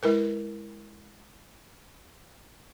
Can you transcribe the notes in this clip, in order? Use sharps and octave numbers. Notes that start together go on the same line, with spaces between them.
G#3 E4 A#4 B4